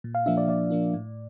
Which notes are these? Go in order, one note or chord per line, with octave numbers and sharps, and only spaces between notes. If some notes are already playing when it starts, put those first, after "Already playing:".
A#2
F5
F3 A#3 D4 E5
D5
A#2 D5
F3 A#3 D4
A2